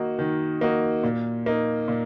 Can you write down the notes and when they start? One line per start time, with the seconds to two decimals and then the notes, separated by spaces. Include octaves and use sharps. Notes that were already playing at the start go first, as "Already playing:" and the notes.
Already playing: D#3 A#3 D#4 F#4
0.19 D#3
0.61 A#3 D#4 F#4
1.03 A#2
1.46 A#3 D#4
1.88 A#2